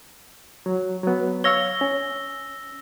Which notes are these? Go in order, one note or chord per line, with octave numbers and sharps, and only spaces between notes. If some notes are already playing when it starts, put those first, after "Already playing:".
F#3
F#3 B3
C#5 F5 C#6 E6 A#6 G7
C#4